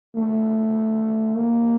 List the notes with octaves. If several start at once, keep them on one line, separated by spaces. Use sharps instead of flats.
A3
A#3